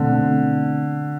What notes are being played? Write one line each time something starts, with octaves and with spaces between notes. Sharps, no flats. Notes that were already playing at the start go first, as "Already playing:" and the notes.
Already playing: B2 D3 A3 C4